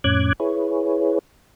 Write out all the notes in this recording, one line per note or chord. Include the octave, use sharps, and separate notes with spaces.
F2 A2 C#4 D6 F#6 G#6
E4 G#4 B4 C#5